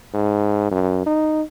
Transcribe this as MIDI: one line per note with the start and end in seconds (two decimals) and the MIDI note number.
0.14 0.69 44
0.71 1.05 42
1.07 1.42 63